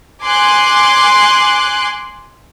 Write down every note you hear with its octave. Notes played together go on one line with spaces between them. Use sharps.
G#5 C6 D6 F#6